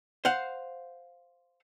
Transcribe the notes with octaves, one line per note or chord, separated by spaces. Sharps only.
C5 F5 F#5